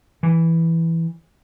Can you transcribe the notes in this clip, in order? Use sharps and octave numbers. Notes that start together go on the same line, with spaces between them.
E3